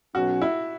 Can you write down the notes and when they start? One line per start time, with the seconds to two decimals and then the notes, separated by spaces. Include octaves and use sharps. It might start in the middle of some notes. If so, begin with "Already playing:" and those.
0.14 B1 B2 F#3 C#4 F#4
0.41 E4